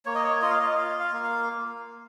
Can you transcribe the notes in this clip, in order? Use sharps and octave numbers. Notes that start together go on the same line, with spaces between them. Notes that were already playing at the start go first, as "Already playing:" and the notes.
A#3 C#5
D#5
C#5
F4 D#5
F5
D#5
F4 F5
F5
A#3
F5